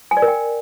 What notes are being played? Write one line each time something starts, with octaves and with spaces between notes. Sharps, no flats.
G#5
D5
A#4
G5